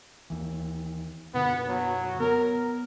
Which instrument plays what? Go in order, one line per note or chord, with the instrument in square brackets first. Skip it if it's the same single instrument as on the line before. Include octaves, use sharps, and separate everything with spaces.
[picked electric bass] D#2 E3
[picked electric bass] F#2 B2 D3 [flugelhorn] B3
[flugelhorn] F#3
[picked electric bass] B3 [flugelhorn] A#4